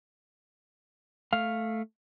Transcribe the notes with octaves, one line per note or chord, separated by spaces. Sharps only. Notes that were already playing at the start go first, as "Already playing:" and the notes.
A3 F5